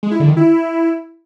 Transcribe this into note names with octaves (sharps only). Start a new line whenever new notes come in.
G#3
E4
D3
D#3
E4